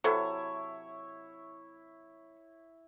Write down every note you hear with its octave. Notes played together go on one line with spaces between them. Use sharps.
C3 F#3 E4 A4 C#5